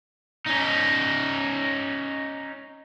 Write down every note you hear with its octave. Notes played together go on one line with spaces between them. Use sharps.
C#4 D#4